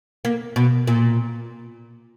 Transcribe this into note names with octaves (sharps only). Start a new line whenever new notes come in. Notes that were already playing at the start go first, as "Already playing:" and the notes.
A#3
B2
A#2